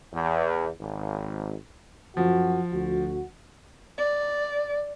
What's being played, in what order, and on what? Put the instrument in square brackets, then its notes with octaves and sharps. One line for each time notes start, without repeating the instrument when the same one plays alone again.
[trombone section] E2
G#1
[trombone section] F#2 F#4 [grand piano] F3
[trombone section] D2 F#4
[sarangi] D5